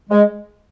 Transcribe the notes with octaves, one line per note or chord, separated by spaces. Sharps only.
G#3